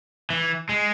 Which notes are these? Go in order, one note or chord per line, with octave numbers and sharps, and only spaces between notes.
E3
G#3